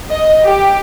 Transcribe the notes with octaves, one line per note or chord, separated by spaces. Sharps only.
D#5
G4